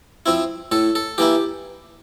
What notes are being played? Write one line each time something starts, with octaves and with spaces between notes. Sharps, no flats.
F3 C4 E4
A2 A4
A4
E3 A#3 E4 G4